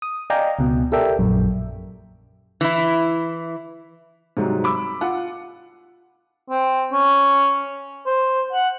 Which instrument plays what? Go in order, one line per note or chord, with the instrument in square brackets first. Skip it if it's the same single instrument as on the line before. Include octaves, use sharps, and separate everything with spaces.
[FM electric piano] D#6
D5 D#5 F5 G5 G#5 A#5
C#2 B2
G4 A4 A#4 D5 E5 G5
A#1 F#2
[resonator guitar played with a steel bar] E3 E4
[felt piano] G#2 C3 F#3 G3
B5 D6 E6
F4 F#5
[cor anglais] C4
C#4
C5
F#5